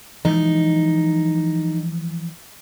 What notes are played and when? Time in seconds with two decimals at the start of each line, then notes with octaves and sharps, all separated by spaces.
0.25 E3 F3 G#3 D#4